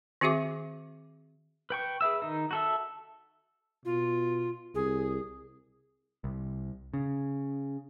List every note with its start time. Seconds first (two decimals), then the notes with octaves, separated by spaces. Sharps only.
0.21 D#3 C4 F#4 G#4 E5 D6
1.70 B4 G5 C#6
2.01 G#4 B4 E5 E6
2.22 D#3 D#4
2.51 F#4 A4 E5
3.85 B2 F4
4.75 C2 G#4
6.24 C2
6.94 C#3